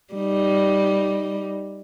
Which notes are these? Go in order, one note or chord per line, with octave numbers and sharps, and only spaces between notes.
G3 D#4